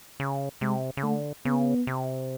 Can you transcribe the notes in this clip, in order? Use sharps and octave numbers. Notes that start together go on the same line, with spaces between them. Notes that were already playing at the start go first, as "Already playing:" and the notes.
C#3
C3 G#3
C#3
D3 A3
C#3 B3
C3